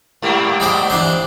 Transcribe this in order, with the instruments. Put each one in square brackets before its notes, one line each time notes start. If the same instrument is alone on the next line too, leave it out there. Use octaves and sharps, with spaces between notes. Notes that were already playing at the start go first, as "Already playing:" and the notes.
[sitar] G#2 G3 A#3
[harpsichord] G#3 G4 C5
E3 D4 C5